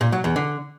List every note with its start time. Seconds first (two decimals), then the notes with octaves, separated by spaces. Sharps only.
0.01 A#2
0.12 F#3
0.24 E2
0.36 D3